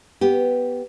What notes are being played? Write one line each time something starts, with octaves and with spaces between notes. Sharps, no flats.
B3 G4